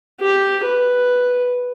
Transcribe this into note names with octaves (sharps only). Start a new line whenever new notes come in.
G4
B4